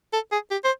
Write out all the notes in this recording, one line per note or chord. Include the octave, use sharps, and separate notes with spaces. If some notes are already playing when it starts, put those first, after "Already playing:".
A4
G#4
G4
C5